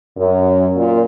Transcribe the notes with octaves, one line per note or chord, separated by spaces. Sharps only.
F#2
A#2